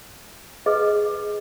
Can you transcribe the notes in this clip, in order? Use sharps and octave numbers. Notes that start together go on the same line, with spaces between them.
G#4 B4 D#5